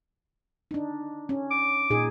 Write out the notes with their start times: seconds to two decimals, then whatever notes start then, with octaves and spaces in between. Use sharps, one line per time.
0.71 D4 D#4
1.29 C#4
1.51 D6
1.90 A#2 D#4 G#4